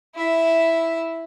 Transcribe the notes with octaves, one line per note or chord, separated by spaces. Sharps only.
E4 E5